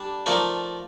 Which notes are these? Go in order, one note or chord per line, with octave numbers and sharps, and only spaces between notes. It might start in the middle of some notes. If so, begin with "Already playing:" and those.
Already playing: G3 D4 A4
F3 A3 D#4 A#4 D5